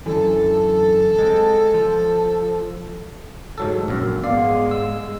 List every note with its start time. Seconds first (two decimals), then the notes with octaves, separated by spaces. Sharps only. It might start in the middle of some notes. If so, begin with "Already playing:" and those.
0.06 F#2 D3 E3 A4
1.19 G#3 C4
1.74 F3
3.58 G#2 F#3 A4
3.88 A#1 F#2
4.24 G#2 G#3 B3 D5 F5
4.71 E6